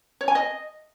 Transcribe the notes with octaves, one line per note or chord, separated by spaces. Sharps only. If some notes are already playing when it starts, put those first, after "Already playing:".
C#5
G#5
D#5